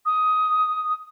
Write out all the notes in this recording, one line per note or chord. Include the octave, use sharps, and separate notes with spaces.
D#6